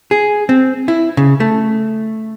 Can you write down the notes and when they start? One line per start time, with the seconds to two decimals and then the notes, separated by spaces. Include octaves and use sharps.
0.11 G#4
0.49 C4
0.88 E4
1.17 C#3
1.40 A3